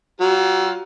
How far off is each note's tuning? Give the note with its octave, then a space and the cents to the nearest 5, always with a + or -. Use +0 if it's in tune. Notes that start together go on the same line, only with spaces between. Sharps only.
F#3 +40 F4 +25